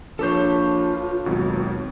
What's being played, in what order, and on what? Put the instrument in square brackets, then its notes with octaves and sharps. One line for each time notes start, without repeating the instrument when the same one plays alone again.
[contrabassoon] A#1 [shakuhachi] F4 [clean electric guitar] A4 B4 C#5 [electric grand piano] A5 D6 G6
[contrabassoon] G#1 [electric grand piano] D#2 B2 F#3